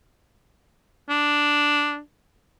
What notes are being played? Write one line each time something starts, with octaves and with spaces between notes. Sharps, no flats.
D4